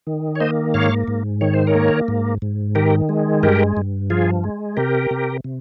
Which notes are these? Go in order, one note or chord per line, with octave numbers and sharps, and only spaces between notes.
D#3
C#5
A#3 C5 D#5
G#2 C#5 F5
G#2
D#3 C#5
C5
A#4 C#5
A#3
G#2
G#2
D#3 G4 A#4
G#3
G2 G4 A#4
G2
F3 F4 G#4
G#3
C3 G4 A#4
C3
C3